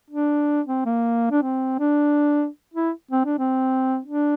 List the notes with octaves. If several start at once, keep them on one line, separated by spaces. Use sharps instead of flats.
D4
C4
A#3
D4
C4
D4
E4
C4
D4
C4
D4